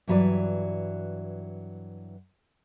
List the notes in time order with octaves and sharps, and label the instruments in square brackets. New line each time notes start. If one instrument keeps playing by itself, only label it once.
[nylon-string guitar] G2 E3 F#3 B4 D5